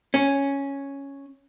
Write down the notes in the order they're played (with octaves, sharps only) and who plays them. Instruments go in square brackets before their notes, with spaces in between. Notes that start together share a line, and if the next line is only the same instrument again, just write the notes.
[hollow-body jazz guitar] C#4